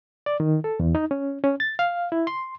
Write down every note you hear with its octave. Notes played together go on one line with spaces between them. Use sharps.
D5
D#3
A4
E2
D#4
C#4
C#4
A6
F5
E4
C6